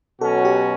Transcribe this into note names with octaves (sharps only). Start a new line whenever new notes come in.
B2 F#3 C#4 F#4 A4
G4